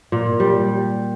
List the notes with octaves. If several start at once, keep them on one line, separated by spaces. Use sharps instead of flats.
A#2
G3